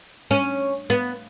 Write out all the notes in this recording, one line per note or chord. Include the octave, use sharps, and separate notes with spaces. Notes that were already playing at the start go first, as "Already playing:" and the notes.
C#4
B3